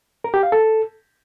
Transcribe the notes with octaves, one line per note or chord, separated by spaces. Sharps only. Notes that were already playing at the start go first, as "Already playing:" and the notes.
A#4
G4
F5
A4